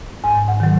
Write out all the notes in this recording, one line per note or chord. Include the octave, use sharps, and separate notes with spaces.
G#2 G#5
F#5
D#3 F#3